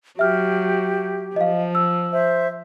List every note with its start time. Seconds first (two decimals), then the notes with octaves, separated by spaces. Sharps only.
0.19 F#3 G4 E5 F6
1.36 F3 D#5 F5
1.75 E6
2.11 C5 E5